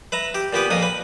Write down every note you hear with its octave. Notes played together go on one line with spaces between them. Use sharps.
B4 E5 A#5
G4
A#2 B3 G4 B4
F2 A#2 A#3 D#6
B4